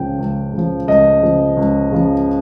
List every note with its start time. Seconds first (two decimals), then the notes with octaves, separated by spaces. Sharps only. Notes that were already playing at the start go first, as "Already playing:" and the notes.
Already playing: C#2 C#3 F3 G5
0.19 C#2
0.53 C#3 F3
0.87 C#2 D#5
1.22 C#3 F3
1.57 C#2
1.92 C#3 F3